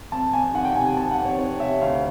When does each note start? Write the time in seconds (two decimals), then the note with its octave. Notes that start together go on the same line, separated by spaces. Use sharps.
0.12 F2 A5
0.33 F2 G#5
0.54 D#3 F#5
0.65 G5
0.76 C3 G#5
0.86 G#5
0.96 F2 A5
1.11 F#5
1.18 F2
1.25 C#5
1.39 D#3 C#5
1.60 C3 E5
1.81 D2 F5